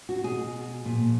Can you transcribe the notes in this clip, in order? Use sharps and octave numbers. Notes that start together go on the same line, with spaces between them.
F#4
B2 G#4
A#2 F3